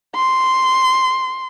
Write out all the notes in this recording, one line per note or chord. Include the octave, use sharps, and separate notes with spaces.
C6